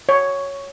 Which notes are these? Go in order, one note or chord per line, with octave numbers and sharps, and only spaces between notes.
C#5